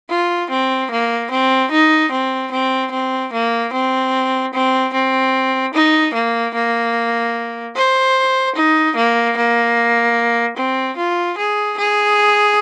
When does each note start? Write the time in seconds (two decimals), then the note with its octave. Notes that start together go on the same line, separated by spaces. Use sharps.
0.09 F4
0.50 C4
0.91 A#3
1.31 C4
1.71 D#4
2.12 C4
2.52 C4
2.91 C4
3.33 A#3
3.73 C4
4.54 C4
4.93 C4
5.74 D#4
6.14 A#3
6.54 A#3
7.76 C5
8.55 D#4
8.96 A#3
9.37 A#3
10.57 C4
10.97 F4
11.38 G#4
11.78 G#4